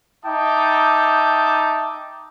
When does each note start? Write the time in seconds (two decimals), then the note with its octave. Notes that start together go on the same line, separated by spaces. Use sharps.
0.25 D#4 E5 G5 A5 D6 D#6